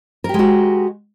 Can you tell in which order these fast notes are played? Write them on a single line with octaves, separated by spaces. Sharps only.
A#4 G4 G#3 F#4